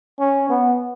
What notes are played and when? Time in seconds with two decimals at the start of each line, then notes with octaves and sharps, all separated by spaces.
0.19 C#4
0.50 B3